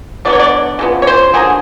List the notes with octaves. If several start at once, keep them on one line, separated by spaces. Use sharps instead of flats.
D3 F#3 B3 D5
C#5
D5
C#3 F3 B3
C#5
C5
D3 F#3 A#3 G#4